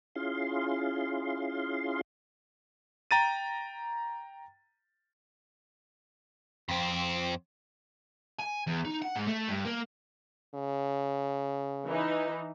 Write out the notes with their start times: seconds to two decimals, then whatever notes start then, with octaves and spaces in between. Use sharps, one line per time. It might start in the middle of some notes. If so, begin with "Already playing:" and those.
0.15 C#4 E4 F4 G#4 F5 C6
3.11 G5 A#5 A6 D#7
6.69 F2 C4
8.40 G#5
8.67 E2
8.85 D#4
9.02 F#5
9.16 G#2
9.28 A3
9.49 G2
9.66 A#3
10.54 C#3
11.87 E3 D#4